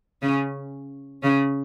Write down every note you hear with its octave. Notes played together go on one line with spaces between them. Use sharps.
C#3 C#4
C#3 C#4